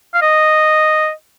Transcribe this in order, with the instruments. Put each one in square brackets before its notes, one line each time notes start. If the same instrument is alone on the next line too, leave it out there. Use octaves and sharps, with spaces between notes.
[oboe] F5
D#5